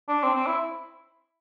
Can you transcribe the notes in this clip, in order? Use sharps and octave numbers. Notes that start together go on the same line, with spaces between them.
D4
C4
C4
E4